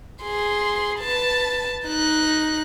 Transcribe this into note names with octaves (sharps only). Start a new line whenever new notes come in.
G#4 C6
B4 A5
D#4 F#6